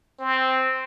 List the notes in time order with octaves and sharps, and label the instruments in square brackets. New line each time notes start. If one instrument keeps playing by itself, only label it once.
[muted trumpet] C4